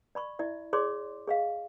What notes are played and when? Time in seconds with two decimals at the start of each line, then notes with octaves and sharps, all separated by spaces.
0.15 D5 B5 C#6
0.39 E4 D5 E5
0.73 G#4 C#5 D5 C6 D6
1.27 G#4 D#5 F5